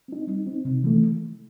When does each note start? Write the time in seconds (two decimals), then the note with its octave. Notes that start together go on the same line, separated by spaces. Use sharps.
0.08 C4 D#4
0.27 G3
0.46 C4 D#4
0.65 C3
0.84 E3 A3